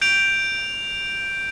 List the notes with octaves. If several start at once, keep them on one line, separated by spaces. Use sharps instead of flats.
G6 D7 F7